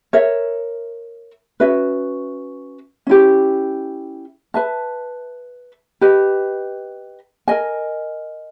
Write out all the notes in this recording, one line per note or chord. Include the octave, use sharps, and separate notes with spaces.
A#4 C#5 E5
C#4 F#4 B4 E5
C#4 E4 G4
B4 E5 A5
G4 B4 D#5
A#4 D#5 G#5